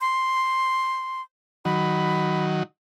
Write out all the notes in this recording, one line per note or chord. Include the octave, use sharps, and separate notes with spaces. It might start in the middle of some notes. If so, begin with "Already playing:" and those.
C6
D#3 F#3 B5